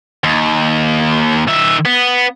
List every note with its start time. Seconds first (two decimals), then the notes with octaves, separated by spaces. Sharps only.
0.24 D#2
1.47 D#3 E5
1.85 B3